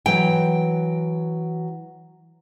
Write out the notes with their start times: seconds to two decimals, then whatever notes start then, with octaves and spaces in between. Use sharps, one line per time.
0.06 E3 F#3 G5